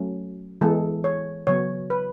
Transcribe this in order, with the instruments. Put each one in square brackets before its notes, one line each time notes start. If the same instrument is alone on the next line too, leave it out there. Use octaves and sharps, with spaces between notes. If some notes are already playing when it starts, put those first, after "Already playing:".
Already playing: [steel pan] F#3 A3 C#4
E3 G#3 B3 A4
C#5
C#3 F#3 B3 C#5
B4